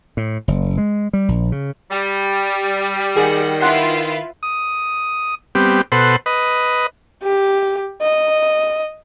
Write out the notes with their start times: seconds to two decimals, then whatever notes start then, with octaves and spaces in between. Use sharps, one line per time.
0.17 A2
0.48 F#1
0.77 G#3
1.13 G3
1.28 A#1
1.52 C#3
1.91 G3
3.17 D#3 G#4 F#5
3.60 E4 F4 B4 F#5 C6
4.43 D#6
5.55 G3 B3 C4 G4
5.92 B2 A4 B4 C5 F#5 C6
6.26 B4 D#5
7.23 G4
8.01 D#5